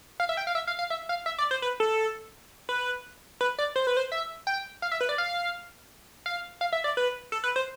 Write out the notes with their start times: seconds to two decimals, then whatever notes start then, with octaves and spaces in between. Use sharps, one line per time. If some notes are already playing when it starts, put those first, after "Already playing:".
0.20 F5
0.29 E5
0.37 G5
0.47 F5
0.55 E5
0.67 F5
0.79 F5
0.90 E5
1.09 F5
1.26 E5
1.38 D5
1.51 C5
1.62 B4
1.80 A4
2.69 B4
3.41 B4
3.59 D5
3.76 C5
3.87 B4
3.97 C5
4.12 E5
4.47 G5
4.82 F5
4.92 E5
5.01 B4
5.09 D5
5.18 F5
6.26 F5
6.61 F5
6.73 E5
6.84 D5
6.97 B4
7.32 A4
7.44 B4
7.56 C5